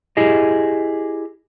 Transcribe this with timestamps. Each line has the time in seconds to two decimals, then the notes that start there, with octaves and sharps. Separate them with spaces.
0.17 E4 G4 G#4 D#5